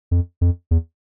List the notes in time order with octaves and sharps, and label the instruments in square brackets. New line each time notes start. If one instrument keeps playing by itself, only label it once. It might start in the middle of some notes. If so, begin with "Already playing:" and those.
[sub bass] F2
F2
E2